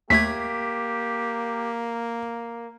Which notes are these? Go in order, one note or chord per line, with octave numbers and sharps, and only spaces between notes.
D#2 A3 A#3 G4 G#6 B6